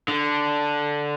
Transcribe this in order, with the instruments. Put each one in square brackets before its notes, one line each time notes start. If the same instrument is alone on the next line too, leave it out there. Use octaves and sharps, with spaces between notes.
[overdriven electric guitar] D3